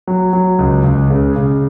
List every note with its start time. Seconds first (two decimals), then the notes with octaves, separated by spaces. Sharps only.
0.07 F#3
0.33 F#3
0.59 C#2
0.84 C#2
1.10 C#3
1.36 C#3